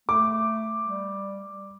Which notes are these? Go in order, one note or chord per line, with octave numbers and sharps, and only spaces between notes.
A3 D6
G3